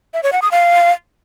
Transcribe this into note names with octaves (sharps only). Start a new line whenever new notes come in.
E5
C#5
F#5
D#6
F5